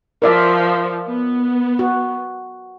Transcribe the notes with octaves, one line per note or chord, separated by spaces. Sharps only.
F3 A#4 D5 E5
B3
F#4